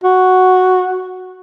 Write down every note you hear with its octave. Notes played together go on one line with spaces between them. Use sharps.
F#4